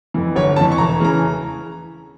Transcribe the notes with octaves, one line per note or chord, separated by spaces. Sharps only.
F2 E3
G1 C#5
F2 E3 A5
C#6
E1 A#5
C#3 E3 A#5